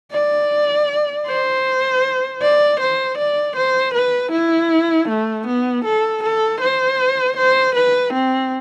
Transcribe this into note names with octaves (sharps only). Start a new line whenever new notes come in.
D5
C5
D5
C5
D5
C5
B4
E4
A3
B3
A4
A4
C5
C5
B4
C4